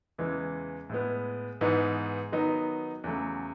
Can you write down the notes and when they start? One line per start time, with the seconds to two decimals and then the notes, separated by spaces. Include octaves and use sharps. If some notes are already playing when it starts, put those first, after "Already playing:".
0.18 E2 C#3 E3 G#3
0.90 A2 G#3 B3
1.61 G#2 E3 B3 D#4
2.32 D#3 F#3 B3 D#4
3.04 E2 C#3 F#3 A3